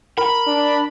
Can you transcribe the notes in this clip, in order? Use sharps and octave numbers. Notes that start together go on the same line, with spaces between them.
A#4 B5
D4